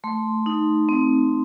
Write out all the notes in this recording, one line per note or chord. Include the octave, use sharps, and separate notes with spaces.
A3 C6
D#4
C4